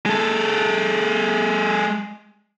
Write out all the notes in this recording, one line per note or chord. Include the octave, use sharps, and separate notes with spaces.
G#3 A4